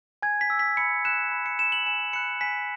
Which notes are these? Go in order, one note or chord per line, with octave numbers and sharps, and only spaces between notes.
G#5 G#6
B6
E6
B6
B5 C#7
F#6 E7
B5
C#7
F#6 E7
F#7
G#5 E7
B5 F#6 C#7
G#5 B6